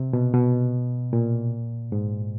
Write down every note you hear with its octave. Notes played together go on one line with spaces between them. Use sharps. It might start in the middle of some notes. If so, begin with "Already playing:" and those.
Already playing: C3
B2
B2
A#2
G#2